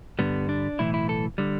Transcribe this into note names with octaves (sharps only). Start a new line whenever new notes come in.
G2 D3 G3 B3
D4
B1 A2 E3 E4
E4
A4
D3 G3